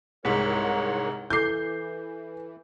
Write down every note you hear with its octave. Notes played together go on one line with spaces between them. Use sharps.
C2 G#2 A#4 C#5 F#5 B6
E3 E4 A4 D6 G6 C7